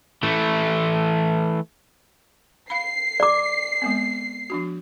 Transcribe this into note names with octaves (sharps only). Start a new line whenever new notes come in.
E3 A3
F5 B5 C7
D5 D6
G#3 B3 C4
F3 D4 F#4